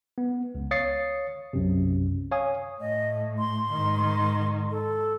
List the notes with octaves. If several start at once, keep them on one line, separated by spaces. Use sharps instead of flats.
B3
C#2
C#5 F5 D#6 A6 C7 C#7
B1 F#2 C3
C#5 F5 G#5 D#6
A2 D#5
C6
G#2 D#3
A4